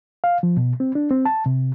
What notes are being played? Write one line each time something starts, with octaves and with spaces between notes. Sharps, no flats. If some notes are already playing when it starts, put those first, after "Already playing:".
F5
F3
B2
C4
D4
C4
A5
C3